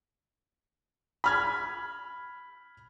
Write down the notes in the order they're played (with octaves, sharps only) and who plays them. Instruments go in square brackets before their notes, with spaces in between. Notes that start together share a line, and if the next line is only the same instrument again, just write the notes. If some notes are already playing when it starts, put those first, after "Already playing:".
[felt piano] B5 F6 G#6